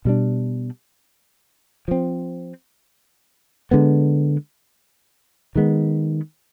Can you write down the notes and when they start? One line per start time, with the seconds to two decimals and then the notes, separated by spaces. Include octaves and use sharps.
0.05 B2 G3 D4
1.88 F3 C4
3.71 D3 G#3 B3
5.55 D#3 G#3 B3